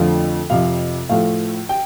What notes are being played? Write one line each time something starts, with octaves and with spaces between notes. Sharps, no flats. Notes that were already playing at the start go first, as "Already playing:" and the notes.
Already playing: F2 D3 F3 A3 F5
F2 C3 F3 F5
A2 F3 A3 F5
G5